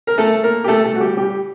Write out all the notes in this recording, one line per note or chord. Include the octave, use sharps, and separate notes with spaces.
A#4
A3 A4
A#3 A#4
G4
A3 A4
A3 A4
F#4
G3 G4
G3 G4